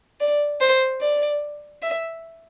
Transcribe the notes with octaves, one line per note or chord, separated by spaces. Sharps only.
D5
C5
D5
E5